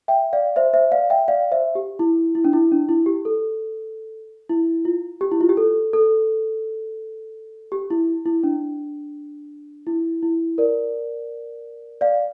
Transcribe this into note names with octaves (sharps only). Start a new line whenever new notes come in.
E5 G5
D5 F5
C5 E5
C5 E5
D5 F5
E5 G5
D5 F5
C5 E5
G4
E4
E4
D4
E4
D4
E4
G4
A4
E4
F4
G4
E4
F4
G4
A4
A4
G4
E4
E4
D4
E4
E4
A#4 D5
D5 F5